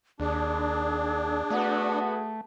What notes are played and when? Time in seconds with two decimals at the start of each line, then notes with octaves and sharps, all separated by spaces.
0.20 D#2 D4 G#4
1.50 A3 B3 F#4